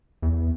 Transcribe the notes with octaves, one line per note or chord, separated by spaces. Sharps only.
E2